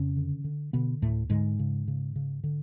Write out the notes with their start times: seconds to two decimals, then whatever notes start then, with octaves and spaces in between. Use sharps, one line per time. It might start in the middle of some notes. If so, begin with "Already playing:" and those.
Already playing: F2 C#3 C#4
0.16 D3
0.44 D3
0.73 B2 D3 B3
1.02 D2 A2 A3
1.30 G#2 D3 G#3
1.59 C#3
1.88 C#3
2.16 C#3
2.44 D3